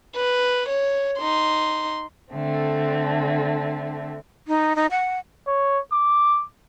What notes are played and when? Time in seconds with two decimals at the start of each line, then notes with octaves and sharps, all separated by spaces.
0.16 B4
0.69 C#5
1.20 D#4 C6
2.33 D3 A3 C4
4.48 D#4
4.76 D#4
4.91 F#5
5.47 C#5
5.92 D6